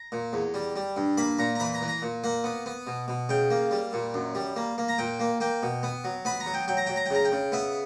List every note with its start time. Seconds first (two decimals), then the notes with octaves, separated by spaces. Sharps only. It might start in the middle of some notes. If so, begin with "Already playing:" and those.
Already playing: A#5
0.12 A#2
0.33 E2
0.54 G3
0.76 G3
0.97 G2
1.18 A#3 B5
1.39 A#2 A#5
1.55 A#5
1.60 E3 B5
1.74 A#5
1.82 E3
1.88 A#5
2.02 A#2
2.24 A#3 F#5
2.44 B3
2.66 B3
2.87 B2
3.08 B2
3.29 C#3 G5
3.50 A#3
3.71 G3
3.93 A#2
4.14 F#2
4.35 G3
4.56 A#3
4.78 A#3
4.88 A#5
4.98 A#2 G5
5.20 A#3
5.40 A#3 G5
5.63 B2
5.83 B3
6.04 F#3
6.25 B3 B5
6.40 A#5
6.46 F#3
6.54 G5
6.68 F#3 G5
6.77 A#5
6.87 F#3 G5
6.96 A#5
7.06 G5
7.10 C#3 A#5
7.25 G5
7.32 C#3
7.52 B3 E5